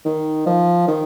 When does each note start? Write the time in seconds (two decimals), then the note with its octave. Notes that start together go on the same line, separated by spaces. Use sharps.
0.05 D#3
0.46 F3
0.88 D#3